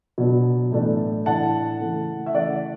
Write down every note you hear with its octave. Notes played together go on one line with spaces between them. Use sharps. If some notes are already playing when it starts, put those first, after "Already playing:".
B2 F#3 B3 D4
A2 E3 A3 D4
A2 E3 A3 D4 F#5 A5
C#3 E3 A3
E5
C#3 E3 A3 D5 F#5